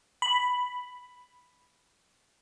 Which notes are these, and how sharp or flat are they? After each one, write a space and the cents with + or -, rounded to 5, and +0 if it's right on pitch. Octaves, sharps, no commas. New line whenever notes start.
B5 +0